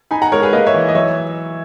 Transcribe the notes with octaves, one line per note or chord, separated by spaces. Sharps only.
D#4 G#5 B5
F#5 A#5
G#3 A#4 C#5
G#4 B4
A#3 B4 D#5
C#5 E5
E3
D#5
F#3 C#5 E5